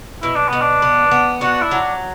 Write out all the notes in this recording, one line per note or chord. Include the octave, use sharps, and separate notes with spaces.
B2 E4
D4
B2 B3
D4
B3
B3
D4 F#4
E4
F#3